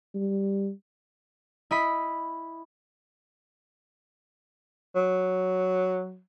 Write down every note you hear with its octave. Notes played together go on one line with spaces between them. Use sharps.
G3
E4 D#5 B5 B6
F#3